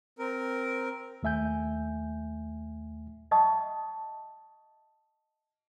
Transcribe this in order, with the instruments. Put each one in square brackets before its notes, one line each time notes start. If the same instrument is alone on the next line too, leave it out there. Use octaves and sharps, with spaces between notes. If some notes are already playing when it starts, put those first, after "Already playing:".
[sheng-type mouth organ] C4 A#4
[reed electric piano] D#2 A3 E5 G#5 G6
[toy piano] D#5 E5 F#5 A5 C#6 D#6